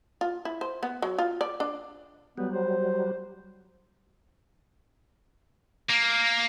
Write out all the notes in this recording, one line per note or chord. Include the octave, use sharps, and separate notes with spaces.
F4
E4
C5
B3
F#3
F4
D5
D4
F#3 G3 B3
C5
A#3